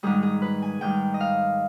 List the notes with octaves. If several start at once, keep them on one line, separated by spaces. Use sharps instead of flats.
G#2 D#3 G3 G#4
G#4
B4
G#5
G#2 D#3 G3 G5
D#5
F5